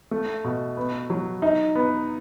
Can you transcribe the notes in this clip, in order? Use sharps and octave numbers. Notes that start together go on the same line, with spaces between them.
A3
B2
B3
F#3
D#4
B3